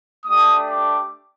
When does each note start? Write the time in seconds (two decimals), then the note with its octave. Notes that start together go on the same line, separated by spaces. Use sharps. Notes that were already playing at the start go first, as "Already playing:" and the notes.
0.25 A3 D4 G4 D#6
0.69 D6